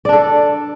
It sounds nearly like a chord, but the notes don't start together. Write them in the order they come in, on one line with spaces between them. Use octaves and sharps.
D5 D4 A4